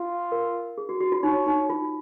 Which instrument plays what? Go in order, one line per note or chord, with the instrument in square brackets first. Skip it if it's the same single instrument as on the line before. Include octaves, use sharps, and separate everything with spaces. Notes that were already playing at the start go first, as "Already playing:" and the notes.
Already playing: [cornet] F4
[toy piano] A#4
G#4
F#4
F#4
F4
[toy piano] D#4 [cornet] C#5
[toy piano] D#4
F4